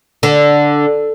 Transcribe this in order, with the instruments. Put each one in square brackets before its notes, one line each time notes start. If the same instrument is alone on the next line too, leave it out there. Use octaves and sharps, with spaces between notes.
[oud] D3